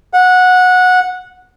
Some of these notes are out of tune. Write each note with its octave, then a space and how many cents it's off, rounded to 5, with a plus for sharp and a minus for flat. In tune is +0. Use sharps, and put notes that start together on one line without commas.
F#5 -15